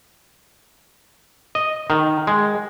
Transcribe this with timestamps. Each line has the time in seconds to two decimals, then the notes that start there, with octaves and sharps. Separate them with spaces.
1.55 D#5
1.90 D#3
2.27 G#3